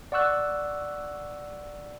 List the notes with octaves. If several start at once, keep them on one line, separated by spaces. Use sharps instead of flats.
D5 F#5 C#6 E6 F#6